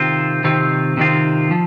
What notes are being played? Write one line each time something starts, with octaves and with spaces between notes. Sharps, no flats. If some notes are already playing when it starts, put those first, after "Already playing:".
Already playing: C3 D#3 C4 F4
C3 D#3 C4 F4
C3 D#3 C4 F4
F3